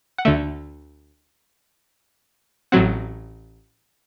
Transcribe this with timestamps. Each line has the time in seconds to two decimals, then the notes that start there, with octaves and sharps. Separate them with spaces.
0.18 F#5
0.25 D2 D3 A3 E5
2.72 A1 A2 F#3 C4 F#5